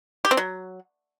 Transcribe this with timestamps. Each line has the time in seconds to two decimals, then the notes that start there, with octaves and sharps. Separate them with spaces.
0.25 G4
0.31 C4
0.37 F#3